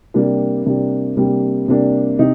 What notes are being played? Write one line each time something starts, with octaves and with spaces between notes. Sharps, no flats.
C3 G3 A#3 D4
C3 G3 A#3 D4
C3 G3 A#3 D4
C3 G3 A#3 D4
C3 D#4